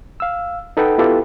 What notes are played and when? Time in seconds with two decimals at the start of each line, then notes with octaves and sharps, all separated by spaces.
0.20 F5 E6
0.77 D#4 A4 B4 F#5 G5
0.98 B3 E4 F4 G4 A4 B4